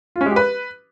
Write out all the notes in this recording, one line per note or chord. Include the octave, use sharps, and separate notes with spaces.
F4
C#4
G#3
G4
B4